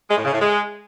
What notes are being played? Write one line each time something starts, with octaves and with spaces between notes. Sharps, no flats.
G#3
A2
C#3
A2
G#3